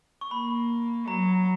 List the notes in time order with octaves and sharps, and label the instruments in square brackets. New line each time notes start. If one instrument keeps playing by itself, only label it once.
[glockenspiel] C#6
[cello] A#3 [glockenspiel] B5
[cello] F#3 [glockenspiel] A#5